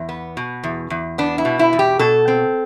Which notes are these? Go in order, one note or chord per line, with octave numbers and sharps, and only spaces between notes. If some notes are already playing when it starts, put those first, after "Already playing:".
Already playing: E2
B3
B2
E2
E2
B3 D4
E4
B2
E4
E2
G4
B2 A4
C4